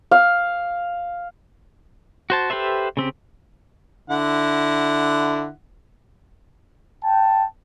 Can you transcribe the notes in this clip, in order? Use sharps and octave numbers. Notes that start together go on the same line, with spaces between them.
F5
F#4 C5 A5
G4 A4 B4 C5 E5
C#3 C4 G4
D3 E4 F#5
G5 A5